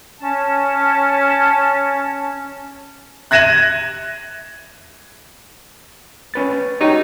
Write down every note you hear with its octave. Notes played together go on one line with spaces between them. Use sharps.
C#4 A5
F#6 G#6 A#6 D#7 E7 F#7
C#4 B4 A6
D#4 F#4 G4 C#5